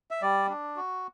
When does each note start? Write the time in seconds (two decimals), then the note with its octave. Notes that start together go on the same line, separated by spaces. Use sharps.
0.11 E5
0.22 G3 D5
0.49 D4
0.76 F#4